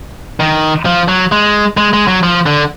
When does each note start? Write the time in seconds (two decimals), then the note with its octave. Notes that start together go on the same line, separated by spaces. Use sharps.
0.40 D#3
0.85 F3
1.08 F#3
1.32 G#3
1.77 G#3
1.93 G#3
2.08 F#3
2.23 F3
2.46 D3